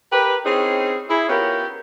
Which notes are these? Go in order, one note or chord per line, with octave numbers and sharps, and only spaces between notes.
G4 A#4 B4
C4 C#4 D#4 E4 G#4
E4 G#4
B3 C#4 F4 G4 A#4